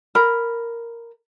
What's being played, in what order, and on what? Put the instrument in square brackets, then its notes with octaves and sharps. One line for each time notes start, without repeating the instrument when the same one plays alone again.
[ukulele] A#4 B5